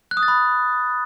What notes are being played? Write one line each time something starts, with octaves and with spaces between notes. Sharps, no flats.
F#6
D#6
A6
B5